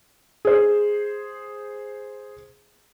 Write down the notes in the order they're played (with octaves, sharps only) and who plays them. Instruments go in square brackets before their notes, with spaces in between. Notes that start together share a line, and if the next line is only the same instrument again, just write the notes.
[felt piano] G#4 C5